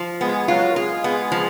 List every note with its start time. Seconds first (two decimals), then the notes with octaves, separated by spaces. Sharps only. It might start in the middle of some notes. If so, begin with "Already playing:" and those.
Already playing: F3
0.21 G#3 B3 G#4
0.48 F#3 F4 F#4
0.69 A#4
0.76 G#3 F4 G#4
1.04 B3
1.32 F3